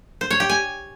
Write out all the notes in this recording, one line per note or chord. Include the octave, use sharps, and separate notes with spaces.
C5
C#5
G4
G#5